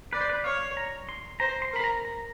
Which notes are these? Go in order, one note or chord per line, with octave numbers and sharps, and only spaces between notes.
B4 D5
C5
B4
C#5 F5
A#5
C6
C5 A#5
C6
A#4 B5
A#5
A#5